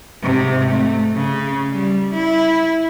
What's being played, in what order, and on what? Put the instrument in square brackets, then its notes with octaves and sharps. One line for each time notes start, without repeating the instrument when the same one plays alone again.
[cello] G#2 C3
A3
C#3
G3
E4